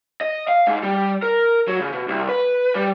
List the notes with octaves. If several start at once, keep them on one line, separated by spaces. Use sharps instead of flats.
D#5
F5
G#2
G3
A#4
F#3
C#3
B2
C2
B4
G3